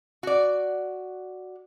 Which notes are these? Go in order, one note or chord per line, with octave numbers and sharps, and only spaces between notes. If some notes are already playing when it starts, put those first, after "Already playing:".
F#4 D5